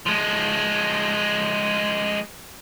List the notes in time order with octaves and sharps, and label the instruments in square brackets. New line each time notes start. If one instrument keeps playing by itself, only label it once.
[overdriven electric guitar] F3 G#3